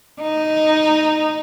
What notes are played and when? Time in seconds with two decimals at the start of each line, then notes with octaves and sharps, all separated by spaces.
0.21 D#4